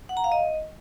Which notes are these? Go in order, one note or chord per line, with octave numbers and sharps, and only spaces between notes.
F#5
A#5
F5
D#5